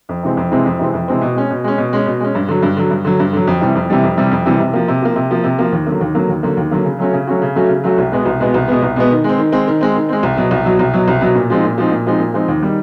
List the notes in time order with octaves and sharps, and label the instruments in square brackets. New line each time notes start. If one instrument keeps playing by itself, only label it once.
[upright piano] F2
C3 E3 G#3 C4
F2
C3 E3 G#3 C4
F2
C3 E3 G#3 C4
F2
C3 E3 G#3 C4
B2
G#3 C#4
B2
G#3 C#4
B2
G#3 C#4
B2
G#3 C#4
G2
D3 F#3
G2
D3 F#3
G2
D3 F#3
G2
D3 F#3
F2
C3 E3 G3
F2
C3 E3 G3
F2
C3 E3 G3
F2
C3 E3 G3
C3
F3 A#3
C3
F3 A#3
C3
F3 A#3
C3
F3 A#3
D#2
D3 F#3 A#3
D#2
D3 F#3 A#3
D#2
D3 F#3 A#3
D#2
D3 F#3 A#3
C#3
F#3 A3 C#4 F#4
C#3
F#3 A3 C#4 F#4
C#3
F#3 A3 C#4 F#4
C#3
F#3 A3 C#4 F#4
C2
B2 G#3 B3
C2
B2 G#3 B3
C2
B2 G#3 B3
C2
B2 G#3 B3
D#3
G#3 C4
D#3
G#3 C4
D#3
G#3 C4
D#3
G#3 C4
C2
B2 F#3
C2
B2 F#3
C2
B2 F#3
C2
B2 F#3
A#2
F3 G#3 C4 D#4
A#2
F3 G#3 C4 D#4
A#2
F3 G#3 C4 D#4
A#2
F3 G#3 C4 D#4
D#2
D#3 G3